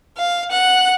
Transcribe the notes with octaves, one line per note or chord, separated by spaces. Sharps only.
F5
F#5 F#6